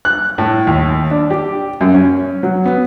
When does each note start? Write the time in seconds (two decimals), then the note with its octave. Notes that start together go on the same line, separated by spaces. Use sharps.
0.05 F#6
0.38 A2
0.67 D#2
1.11 D4
1.30 G4
1.81 F#2
1.94 C#4
2.43 F#3
2.65 B3